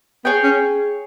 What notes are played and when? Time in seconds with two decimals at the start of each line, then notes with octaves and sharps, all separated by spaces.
0.25 B3 G#4 C#5 G5
0.43 C#4